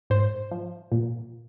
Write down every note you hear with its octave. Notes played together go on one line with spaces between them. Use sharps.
G#2 C5
F3
A#2